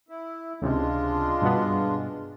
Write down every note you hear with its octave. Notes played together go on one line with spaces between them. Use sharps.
E4
C#2 C3 G#3 D4 F4
G2 B2 B3